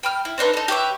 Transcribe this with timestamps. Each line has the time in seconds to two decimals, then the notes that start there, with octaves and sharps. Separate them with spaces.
0.03 G5 B5 F6
0.25 E4
0.38 C4 D4 D#4 B4
0.54 D#4 A4
0.68 G4 B4 C#5 E5